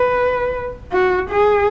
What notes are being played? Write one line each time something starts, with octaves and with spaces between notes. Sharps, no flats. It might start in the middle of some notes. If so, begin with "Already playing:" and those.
Already playing: B4
F#4
G#4